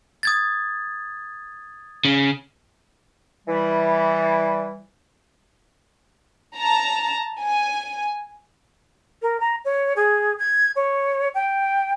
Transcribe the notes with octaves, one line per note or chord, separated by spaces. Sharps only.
D#6 G#6 A6
C#3
E3 G3
A5 A#5
G#5
A#4
A#5
C#5
G#4
G#6
C#5
G5